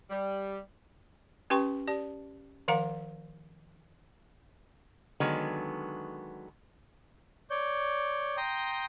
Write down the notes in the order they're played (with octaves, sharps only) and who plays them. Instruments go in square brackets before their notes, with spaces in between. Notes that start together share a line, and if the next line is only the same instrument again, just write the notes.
[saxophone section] G3
[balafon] C#4 G4 B4 G5 C6 C#6
G4 D5 A5
D#3 F3 A#4 F5 F#5 A#5
[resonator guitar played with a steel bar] D3 D#3 F#3 G#3 B3
[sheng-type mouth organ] C#5 D5 G6
G5 A#5 C6 D#6 G6